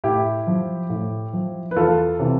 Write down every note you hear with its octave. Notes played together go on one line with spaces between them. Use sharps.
A2 E4 G4
F3
A2
F3
B4
E2 F4 A4
C3 E3